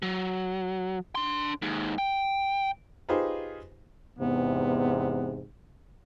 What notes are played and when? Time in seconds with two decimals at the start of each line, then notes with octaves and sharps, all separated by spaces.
0.02 F#3
1.15 D4 C6
1.62 D#2 G#2
1.98 G5
3.09 D#4 F4 G4 G#4 B4 C5
4.19 E2 G#2 C3 B3